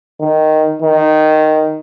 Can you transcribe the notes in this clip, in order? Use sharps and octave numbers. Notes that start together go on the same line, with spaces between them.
D#3
D#3